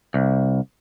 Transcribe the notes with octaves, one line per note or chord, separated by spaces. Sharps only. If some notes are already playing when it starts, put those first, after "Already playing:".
C2